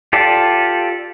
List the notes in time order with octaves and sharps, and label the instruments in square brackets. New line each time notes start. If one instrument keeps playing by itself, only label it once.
[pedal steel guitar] F4 G4 A4 D5